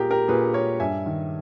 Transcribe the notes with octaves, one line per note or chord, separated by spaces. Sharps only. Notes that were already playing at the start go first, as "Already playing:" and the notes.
Already playing: A#2 G4 G#4 A#4
G4 A#4
A#2 G#4 B4
A#4 C#5
G2 E5 G#5
D#3